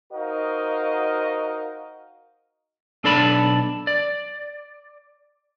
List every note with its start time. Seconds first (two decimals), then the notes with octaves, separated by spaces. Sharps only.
0.13 D#4 F#4 A#4 C5 D#5 F5
3.04 B1 D4 A4 D5 A5 B5
3.87 D5